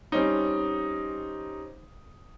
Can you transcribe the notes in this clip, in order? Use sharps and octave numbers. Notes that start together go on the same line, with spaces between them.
G3 C4 C#4 D#4